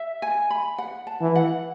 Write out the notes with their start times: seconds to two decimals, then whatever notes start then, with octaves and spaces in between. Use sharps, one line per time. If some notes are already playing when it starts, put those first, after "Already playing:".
Already playing: E5
0.22 G#5
0.50 B5
0.78 F#5
1.07 A5
1.21 E3
1.36 F#5